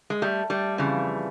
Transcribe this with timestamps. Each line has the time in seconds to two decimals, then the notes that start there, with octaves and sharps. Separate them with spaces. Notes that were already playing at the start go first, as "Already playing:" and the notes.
0.10 G#3
0.22 G3 A3
0.50 G3 A3
0.78 F2 C#3 E3